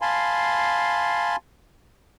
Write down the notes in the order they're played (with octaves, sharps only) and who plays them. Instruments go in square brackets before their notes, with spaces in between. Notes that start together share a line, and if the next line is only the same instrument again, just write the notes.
[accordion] F5 G#5 A5 B5 C6